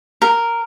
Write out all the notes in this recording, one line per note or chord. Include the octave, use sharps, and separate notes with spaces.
A#4